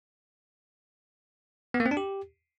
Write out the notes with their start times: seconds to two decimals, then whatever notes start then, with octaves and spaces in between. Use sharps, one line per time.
1.74 B3
1.80 A#3
1.86 C4
1.91 D4
1.97 G4